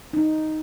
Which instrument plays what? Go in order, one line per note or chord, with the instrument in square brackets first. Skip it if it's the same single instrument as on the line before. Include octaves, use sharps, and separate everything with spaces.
[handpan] D#4